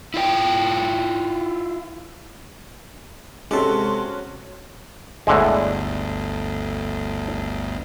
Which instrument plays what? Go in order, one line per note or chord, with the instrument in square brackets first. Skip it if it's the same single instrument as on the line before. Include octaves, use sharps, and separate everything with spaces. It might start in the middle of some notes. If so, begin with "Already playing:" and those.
[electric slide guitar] E4 F4 C5 G5
[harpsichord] C3 G4 [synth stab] G#3 A4 [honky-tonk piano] C#4 F#4 [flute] C6
[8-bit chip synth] G1 D2 [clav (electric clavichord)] A2 D3 G#3